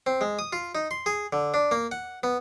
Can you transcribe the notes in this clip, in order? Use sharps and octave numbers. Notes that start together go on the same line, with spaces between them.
C4
G#3
D#6
F4
D#4
C6
G#4
D3
D4
A#3
F#5
B3